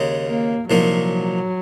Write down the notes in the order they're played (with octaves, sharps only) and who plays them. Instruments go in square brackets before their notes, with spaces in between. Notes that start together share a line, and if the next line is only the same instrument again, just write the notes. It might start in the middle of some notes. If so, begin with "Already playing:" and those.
Already playing: [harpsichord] D#2 C#3 G#3 D#4
[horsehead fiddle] A#3
[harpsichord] C2 A#2 F3 A#3 D#4 [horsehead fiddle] F#3